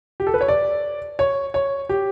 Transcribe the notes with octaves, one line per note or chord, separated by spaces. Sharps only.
G4
A4
B4
C#5
D5
C#5
C#5
G4